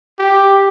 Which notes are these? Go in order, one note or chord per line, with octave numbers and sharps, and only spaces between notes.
G4